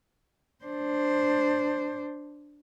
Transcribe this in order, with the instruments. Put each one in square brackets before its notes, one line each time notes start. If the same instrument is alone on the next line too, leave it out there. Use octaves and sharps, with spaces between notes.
[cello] D4 C5